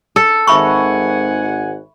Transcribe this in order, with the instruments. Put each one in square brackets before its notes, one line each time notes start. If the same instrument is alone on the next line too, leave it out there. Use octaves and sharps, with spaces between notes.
[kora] A4
[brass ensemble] G#1 F#5 G#5 [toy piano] E5 B5 C#6